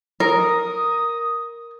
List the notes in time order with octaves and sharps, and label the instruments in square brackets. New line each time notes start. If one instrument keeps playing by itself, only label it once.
[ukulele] A#4 [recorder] D#6